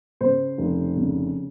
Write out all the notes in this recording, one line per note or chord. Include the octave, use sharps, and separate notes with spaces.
C#3 C5
F1
C#3